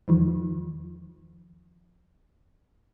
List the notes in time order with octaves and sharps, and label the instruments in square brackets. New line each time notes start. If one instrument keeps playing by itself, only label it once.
[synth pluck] E2 D#3 F3